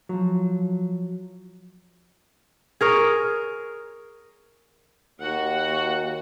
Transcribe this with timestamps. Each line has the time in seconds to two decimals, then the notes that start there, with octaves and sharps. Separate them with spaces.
0.09 F3 F#3
2.81 G#4 A#4 C#5
5.21 D#2 F#4 F#5